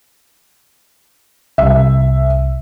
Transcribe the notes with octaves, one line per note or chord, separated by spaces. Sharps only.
C2 E5